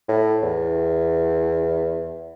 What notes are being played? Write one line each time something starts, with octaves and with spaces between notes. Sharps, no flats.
A2
E2